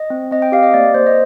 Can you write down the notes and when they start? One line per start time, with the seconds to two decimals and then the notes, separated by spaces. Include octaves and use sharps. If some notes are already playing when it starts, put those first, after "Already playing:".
Already playing: D#5
0.10 C4
0.31 C4 D#5
0.42 G5
0.52 G4 F5
0.63 D#5
0.74 A#3 D5
0.94 A#3 C5
1.06 D#5